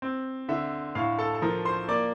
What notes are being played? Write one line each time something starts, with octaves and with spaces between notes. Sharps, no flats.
C4
D3 E5
A2 F5
A4 A5
A5
F3 A#4 A#5
C5 C6
A#3 D5 D6